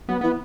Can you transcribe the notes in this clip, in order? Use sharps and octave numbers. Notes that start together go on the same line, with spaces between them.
F#3 B3
E3 B3